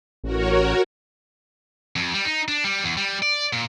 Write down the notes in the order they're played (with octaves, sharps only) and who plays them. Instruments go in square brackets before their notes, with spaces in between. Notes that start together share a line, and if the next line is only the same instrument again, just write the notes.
[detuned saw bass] A1 [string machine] F#4 A#4 C#5
[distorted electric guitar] F2
G3
D#4
D4
G3
E2
G3
D5
A#2